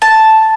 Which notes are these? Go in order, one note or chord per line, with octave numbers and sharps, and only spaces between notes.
A5